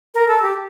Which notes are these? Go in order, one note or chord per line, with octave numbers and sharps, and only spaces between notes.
A#4
A4
G4